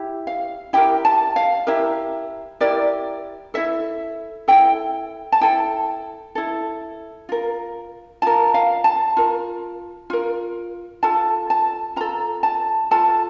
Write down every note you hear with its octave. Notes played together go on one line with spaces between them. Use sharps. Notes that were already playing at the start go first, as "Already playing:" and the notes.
Already playing: E4 G4
F5
E4 G4 A#4 G5
A5
F5
E4 G4 A#4 E5
E4 G4 A#4 D5
E4 A4 E5
E4 A4 G5
A5
E4 A4 G5
E4 A4
F4 A#4
F4 A#4 A5
F5
A5
F4 A#4
F4 A#4
F4 A4 A5
A5
F4 A4 A#5
A5
F4 A4 A5